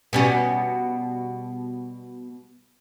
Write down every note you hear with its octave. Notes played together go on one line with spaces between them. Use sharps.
B2 G3 C#4